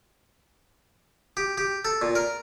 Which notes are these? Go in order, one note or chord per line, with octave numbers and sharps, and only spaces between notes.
G4
G4
A4
A#2
A#4